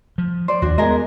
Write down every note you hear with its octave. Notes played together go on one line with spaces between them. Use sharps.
F3
C5 D5
D#2 D4 F#4
G#3 B3 G#4 A#4 D#5